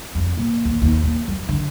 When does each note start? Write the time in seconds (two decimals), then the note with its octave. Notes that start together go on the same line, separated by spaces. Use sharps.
0.15 F2
0.37 A#2
0.65 D#2
0.82 D#2
1.04 A#2
1.28 F#2
1.49 D3